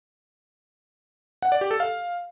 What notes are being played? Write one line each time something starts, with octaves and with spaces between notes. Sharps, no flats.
F#5
D5
G4
A4
F5